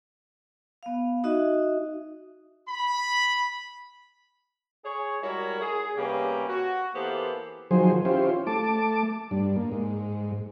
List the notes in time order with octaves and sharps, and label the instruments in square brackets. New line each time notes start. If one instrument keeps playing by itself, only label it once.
[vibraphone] B3 F5
D#4 F#4 D#5 E5
[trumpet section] B5
[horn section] G#4 C#5
G3 G#3 E4 F#4 A#4 C#5
G#4
C3 G3 A#3 B3 C#4 G4
F#4
E3 A#3 B3 G4 A4 C5
[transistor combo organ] D#3 F3 F#3 G#4 C5
C#4 E4 F4 G4 C5
A3 A5 D6
G2 D4
A#3
G#2